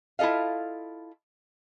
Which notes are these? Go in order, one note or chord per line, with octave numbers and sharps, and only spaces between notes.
E4 F4 A4 D#5 F5